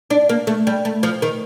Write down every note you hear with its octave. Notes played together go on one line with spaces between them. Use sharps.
D4
A#3
A3
G3
A3
F3
D#3